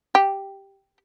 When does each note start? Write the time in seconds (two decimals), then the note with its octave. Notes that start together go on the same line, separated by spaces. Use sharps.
0.15 G4